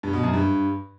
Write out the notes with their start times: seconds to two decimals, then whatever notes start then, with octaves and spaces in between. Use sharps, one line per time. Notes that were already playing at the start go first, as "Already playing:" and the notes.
0.03 G2
0.13 B2
0.23 F#2
0.33 G2